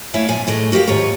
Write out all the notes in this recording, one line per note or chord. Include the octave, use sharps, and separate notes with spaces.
A3 E4 C#5 E5 F5 G#5
F2 A#2 G#5
A2 E3 A3 G#4 A#4 D#5
F#4 G4 A#4 D#5 F5
D#2 G#2 F4 C#5 A#5